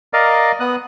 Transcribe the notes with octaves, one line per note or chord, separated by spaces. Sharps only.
A#4 D5 D#5 F5
B3 D#6 F#6